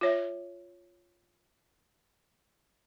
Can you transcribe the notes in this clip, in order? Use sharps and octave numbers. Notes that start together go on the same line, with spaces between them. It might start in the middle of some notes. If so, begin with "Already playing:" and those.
F4 C#5 E5